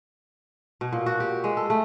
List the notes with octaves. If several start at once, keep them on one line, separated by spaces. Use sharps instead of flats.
B2
A#2
F#4
G4
G#3
A4
A3